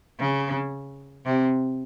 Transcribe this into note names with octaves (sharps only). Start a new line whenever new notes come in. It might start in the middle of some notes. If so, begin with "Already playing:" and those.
C#3
C3